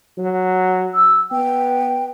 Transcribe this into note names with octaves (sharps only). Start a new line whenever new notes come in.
F#3
E6
B3 G5